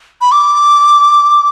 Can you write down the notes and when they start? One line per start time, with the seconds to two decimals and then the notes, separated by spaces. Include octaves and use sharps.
0.21 B5
0.32 D6